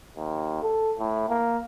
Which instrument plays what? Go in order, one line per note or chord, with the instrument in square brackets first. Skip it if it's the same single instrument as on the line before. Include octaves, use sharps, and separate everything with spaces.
[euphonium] D#2
A4
A2
A#3